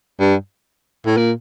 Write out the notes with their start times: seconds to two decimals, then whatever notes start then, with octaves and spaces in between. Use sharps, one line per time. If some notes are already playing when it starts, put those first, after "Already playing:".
0.20 G2
1.06 A2
1.17 A#2